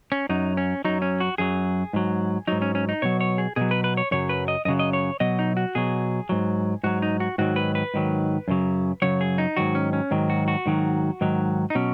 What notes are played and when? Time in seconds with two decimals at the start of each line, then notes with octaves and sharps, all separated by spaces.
0.12 C#4
0.29 F#2 F#3 D#4
0.57 C#4
0.85 F#2 F#3 D#4
1.02 C#4
1.20 F#4
1.38 F#2 F#3 G#4
1.93 G#2 F#3
2.47 G#2 F#3 D#4
2.62 C#4
2.75 C#4
2.89 D#4
3.02 B2 F#3 C#5
3.21 C#5
3.38 G#4
3.56 B2 F#3 G#4
3.71 B4
3.84 B4
3.97 C#5
4.11 F#2 C#3 F#3 C#5
4.29 B4
4.48 D#5
4.65 F#2 D#5
4.68 C#3 F#3
4.79 D#5
4.93 C#5
5.20 B2 F#3 D#5
5.39 D#4
5.57 F#4
5.75 B2 F#3 G#4
6.29 G#2 F#3
6.83 G#2 F#3 F#4
7.02 D#4
7.20 F#4
7.38 G#2 D#3 F#3 F#4
7.56 B4
7.75 B4
7.94 G#2 D#3 F#3
8.48 F#2 C#3 F#3
9.02 F#2 C#3 F#3 C#5
9.21 G#4
9.38 D#4
9.57 G#2 D#3 F#3 F#4
9.75 C#4
9.93 C#4
10.11 G#2 D#3 F#3
10.30 F#4
10.48 F#4
10.66 G#2 D#3 F#3
11.21 G#2 D#3 F#3
11.70 D#4
11.75 B2 F#3 C#4